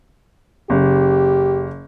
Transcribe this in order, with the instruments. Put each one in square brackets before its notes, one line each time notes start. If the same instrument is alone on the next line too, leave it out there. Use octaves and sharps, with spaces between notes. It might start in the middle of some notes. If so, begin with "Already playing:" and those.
[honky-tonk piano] F#1 [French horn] G4